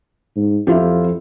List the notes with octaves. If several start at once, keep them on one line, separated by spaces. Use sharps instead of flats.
G#2
F2 E4 F4 G4